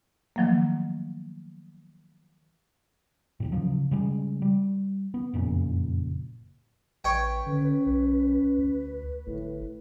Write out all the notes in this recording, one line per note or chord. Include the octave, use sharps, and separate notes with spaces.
D#3 F3 F#3 A3 A#3
A1 D#2 A2
C#3 F3 F#3
C#3 G3 G#3
G3
B3
F#1 F2 A#2 C#3
A1 B4 C#5 G5
D3 C#4
B1
D2
G1 A2